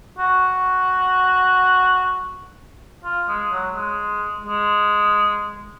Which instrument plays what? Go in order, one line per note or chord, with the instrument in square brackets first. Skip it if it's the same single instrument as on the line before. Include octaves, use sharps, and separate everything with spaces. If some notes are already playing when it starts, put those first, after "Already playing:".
[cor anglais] F#4
F4
G#3
F#3
G#3
G#3